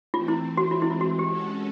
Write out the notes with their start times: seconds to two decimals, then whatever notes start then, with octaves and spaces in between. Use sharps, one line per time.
0.14 E3 A3 C4 F4
0.28 E4
0.57 F#4
0.71 E3 G#3 C4 F4
0.82 E4
0.91 F4
1.01 F#4
1.19 G4
1.29 G#3 C#4 F#4 A4